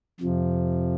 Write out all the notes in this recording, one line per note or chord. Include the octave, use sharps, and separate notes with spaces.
F2 C3 F3